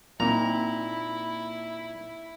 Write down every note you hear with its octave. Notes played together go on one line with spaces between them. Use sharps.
A#2 A#3 C4 D#4 E4 A#5